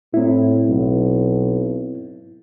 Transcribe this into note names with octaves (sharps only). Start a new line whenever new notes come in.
A2 C4 E4
B1